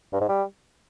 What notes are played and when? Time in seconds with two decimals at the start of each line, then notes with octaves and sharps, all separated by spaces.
0.13 G2
0.21 G#2
0.29 G3